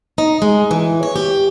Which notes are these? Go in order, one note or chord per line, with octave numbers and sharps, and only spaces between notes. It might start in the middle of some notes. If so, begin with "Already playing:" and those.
D#4
G#3
E3
C#5
G4